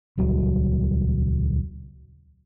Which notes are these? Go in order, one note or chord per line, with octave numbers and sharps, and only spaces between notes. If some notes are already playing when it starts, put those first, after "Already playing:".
D#1 C#2 F#3 G3